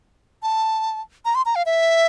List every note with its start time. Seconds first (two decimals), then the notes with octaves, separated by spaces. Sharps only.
0.43 A5
1.25 A#5
1.35 C6
1.46 A#5
1.55 F5
1.66 E5